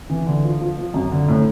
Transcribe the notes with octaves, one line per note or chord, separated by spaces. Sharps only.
E3
D3
F3
F3
F3
F#2
D3
A2